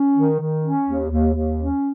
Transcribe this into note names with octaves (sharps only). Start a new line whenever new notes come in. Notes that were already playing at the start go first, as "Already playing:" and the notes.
Already playing: C#4
D#3
D#3
C#4
D#2
D#2
D#2
C#4